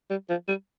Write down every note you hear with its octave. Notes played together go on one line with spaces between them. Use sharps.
G3
F3
G3